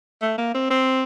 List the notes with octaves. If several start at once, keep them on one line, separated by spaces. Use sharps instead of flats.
A3
A#3
C4
C4